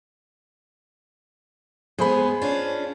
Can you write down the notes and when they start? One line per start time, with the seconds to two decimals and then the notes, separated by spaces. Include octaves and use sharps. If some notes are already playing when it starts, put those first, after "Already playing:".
1.99 G#3 B3 G#4 C5 B5
2.42 C#4 D4 F4